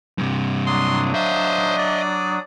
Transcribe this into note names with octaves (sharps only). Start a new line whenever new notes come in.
G2 C3
F#3 D4 C6 D#6
C5 D#5 E5
D5